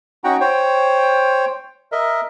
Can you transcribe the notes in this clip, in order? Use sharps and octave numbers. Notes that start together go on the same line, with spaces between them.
C#4 D#4 F#4 F#5 G5 A#5
C5 C#5 G5
A#4 D#5 E5